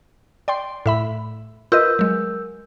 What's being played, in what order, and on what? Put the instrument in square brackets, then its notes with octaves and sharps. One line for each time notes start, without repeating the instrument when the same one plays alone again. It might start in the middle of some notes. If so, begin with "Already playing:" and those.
[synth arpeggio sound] D5 G5 C6
A2 E5 B5
[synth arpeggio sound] F4 B4 D#5 [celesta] A#4 E6 G6
[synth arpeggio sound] F#3 G#3